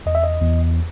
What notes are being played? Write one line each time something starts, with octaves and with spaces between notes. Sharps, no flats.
E2 D#5
E5
D#5
E2